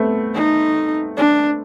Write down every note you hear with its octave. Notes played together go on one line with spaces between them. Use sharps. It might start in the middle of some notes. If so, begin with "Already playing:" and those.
Already playing: A3 B3 C4
D#4
D4